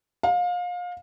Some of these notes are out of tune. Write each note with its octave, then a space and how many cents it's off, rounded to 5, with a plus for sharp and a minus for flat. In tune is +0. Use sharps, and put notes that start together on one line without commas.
F5 +30